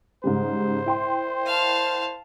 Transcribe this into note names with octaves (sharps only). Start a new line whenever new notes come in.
G#2 C#3 G3 C5
E4 G5 C6
F5 A5